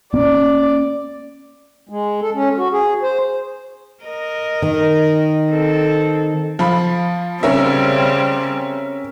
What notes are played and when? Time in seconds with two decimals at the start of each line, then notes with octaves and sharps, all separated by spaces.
0.14 A#3 C#4 D5
1.89 G#3
2.22 A4
2.34 C#4
2.57 F#4
2.72 G#4
3.02 C5
4.04 A#4 D#5
4.62 D#3
5.50 C4 A4
6.59 F3 F4 B5
7.43 C#3 G3 C4 C#4 A#4 E5